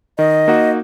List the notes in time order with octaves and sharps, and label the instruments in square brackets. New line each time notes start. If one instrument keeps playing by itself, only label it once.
[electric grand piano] D#3 [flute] D#5
[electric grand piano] A#3 D#4 F#4